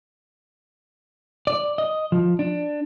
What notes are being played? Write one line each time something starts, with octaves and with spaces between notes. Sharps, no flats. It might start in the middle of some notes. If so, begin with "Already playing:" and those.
D5
D#5
F3
D4